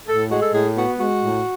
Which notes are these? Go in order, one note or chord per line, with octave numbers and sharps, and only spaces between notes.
A2 A4
G#3 F#4
A4
A2 G#4
B3 F#4
G#3 F#4
A2